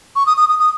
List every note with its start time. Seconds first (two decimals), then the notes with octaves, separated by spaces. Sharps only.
0.16 C#6
0.27 D#6
0.37 D#6
0.49 D#6
0.59 D#6